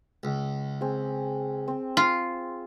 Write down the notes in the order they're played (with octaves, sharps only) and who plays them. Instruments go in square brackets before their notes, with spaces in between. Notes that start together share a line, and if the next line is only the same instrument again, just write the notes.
[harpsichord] C#2
[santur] C4 G#4
C4
[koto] F4